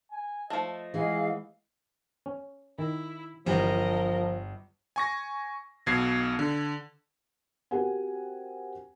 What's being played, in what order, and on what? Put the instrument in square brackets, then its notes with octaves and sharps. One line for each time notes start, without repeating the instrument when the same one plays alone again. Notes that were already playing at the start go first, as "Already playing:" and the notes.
[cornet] G#5
[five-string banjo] F3 A3 [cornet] D#5
[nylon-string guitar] E3 G#3 [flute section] G#4 F5 F#5
[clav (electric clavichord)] C#4
[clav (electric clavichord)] D#3 [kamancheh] E4
[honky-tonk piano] G1 [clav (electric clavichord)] C3 E3 [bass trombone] F3 [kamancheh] A#4 D#5
[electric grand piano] G#5 C#6 A#6
B1 B2 G#6 C7
D3
[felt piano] C4 F#4 G4 A#4 F#5 G#5